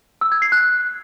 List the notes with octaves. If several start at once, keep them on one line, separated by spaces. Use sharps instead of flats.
E6
G#6
C7
F#6